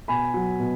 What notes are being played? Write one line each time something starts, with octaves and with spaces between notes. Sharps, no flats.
B2 G#5 B5
F#3
B2